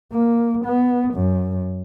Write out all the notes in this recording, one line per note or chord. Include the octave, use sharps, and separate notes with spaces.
A#3
B3
F#2